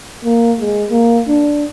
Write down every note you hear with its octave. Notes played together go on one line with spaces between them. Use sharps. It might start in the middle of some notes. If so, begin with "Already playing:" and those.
A#3
G#3
A#3
D4